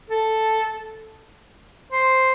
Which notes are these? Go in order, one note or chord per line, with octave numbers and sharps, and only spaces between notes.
A4
C5